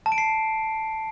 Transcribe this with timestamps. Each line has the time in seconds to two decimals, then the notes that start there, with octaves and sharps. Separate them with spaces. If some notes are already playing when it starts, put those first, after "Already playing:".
0.06 A5
0.12 D7
0.18 C7